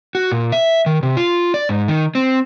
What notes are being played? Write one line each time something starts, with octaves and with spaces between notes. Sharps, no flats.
F#4
A#2
E5
D#3
C3
F4
D5
G#2
D#3
C4